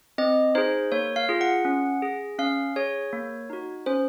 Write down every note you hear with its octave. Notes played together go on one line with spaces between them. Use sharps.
C4 D#5
D#4 G#4 C5
A#3 C#5
F5
F4 G#4
F#5
C#4
G#4
C#4 F5
G#4 C#5
A#3
D#4 F#4
C#4 C5